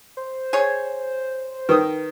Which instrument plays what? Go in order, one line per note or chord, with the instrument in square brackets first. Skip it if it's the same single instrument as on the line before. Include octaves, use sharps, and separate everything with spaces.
[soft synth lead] C5
[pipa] G#4 C#5
[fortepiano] D#3 D#6 [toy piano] B4